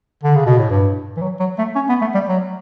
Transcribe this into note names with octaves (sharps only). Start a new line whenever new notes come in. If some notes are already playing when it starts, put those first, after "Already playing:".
D3
C#3
B2
A2
G2
E3
F#3
F#3
A3
C#4
B3
A3
G3
F#3